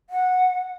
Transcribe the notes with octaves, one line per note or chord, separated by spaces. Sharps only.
F#5